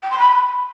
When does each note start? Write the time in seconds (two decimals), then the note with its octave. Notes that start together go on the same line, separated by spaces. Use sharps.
0.02 G5
0.10 C6
0.18 B5